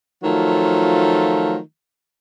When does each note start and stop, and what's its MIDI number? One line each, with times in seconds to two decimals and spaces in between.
0.24 1.58 51
0.24 1.58 53
0.24 1.58 54
0.24 1.58 57
0.24 1.58 65